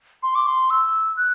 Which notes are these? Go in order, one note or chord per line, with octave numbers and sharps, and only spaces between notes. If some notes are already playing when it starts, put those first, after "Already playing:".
C6
D6
C6
E6
F#6